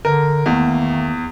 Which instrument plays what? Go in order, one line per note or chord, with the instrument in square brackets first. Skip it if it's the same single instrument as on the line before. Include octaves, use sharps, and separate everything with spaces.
[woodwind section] D3 [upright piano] A#4
[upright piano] E2 [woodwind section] D#3 A3 A#3